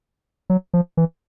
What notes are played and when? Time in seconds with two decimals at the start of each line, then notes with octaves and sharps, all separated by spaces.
0.50 F#3
0.74 F3
0.97 E3